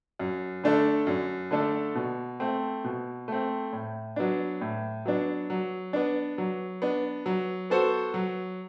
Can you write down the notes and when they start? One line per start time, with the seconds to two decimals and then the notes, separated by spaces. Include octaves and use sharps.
0.19 F#2
0.64 D3 A3 D4 A4
1.07 F#2
1.51 D3 A3 D4 A4
1.95 B2
2.40 A3 C4
2.84 B2
3.28 A3 C4
3.73 A2
4.16 F#3 B3 D4
4.61 A2
5.06 F#3 B3 D4
5.50 F#3
5.93 B3 D4
6.38 F#3
6.82 B3 D4
7.26 F#3
7.70 B3 F#4 A4 C5
8.14 F#3